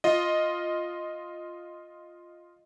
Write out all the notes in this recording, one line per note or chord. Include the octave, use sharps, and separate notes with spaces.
F4 D#5